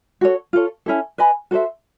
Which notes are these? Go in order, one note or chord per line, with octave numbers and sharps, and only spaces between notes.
F#4 A4 C#5
F4 A4 C#5
C#4 E4 A4
B4 D#5 G#5 B5
F#4 A4 C5 E5